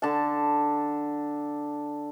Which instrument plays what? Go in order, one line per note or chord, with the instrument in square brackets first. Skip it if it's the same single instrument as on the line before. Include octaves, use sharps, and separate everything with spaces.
[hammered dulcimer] D3 A5